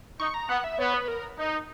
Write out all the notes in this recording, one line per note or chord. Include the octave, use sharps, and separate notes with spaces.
D#4 C#6
A#5
B3 F#5
E5
B3 C#5
B4
A#4
D#4